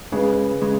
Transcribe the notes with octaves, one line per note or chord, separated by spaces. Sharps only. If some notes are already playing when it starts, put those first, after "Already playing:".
C#2 C#3 G#3 G#4 B4
C#3 G#3